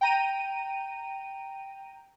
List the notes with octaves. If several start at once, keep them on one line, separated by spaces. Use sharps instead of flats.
G5 A#5 D#7